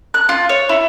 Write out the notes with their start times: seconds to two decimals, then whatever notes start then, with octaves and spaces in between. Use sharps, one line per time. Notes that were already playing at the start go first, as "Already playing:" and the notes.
0.14 F#6
0.29 F4
0.49 C#5
0.69 E4